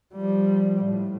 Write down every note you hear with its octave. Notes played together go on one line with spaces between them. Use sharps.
F3 G3
A2